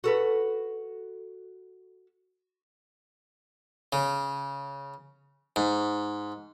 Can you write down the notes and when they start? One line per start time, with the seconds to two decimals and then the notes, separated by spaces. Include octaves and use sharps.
0.04 F#4 A4 B4
3.93 C#3
5.56 G#2